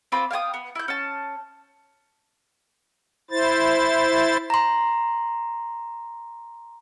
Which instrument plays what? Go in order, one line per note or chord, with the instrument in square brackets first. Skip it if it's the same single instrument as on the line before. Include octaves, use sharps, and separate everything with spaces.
[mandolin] C4 F4 B5 D6
F5 G5 G#5 D#6
B3
E4 G6
C#4 A5
[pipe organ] E4 C5 A6
[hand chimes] A#5 C6